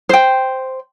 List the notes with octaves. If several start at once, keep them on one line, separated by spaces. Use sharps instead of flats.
C5 G5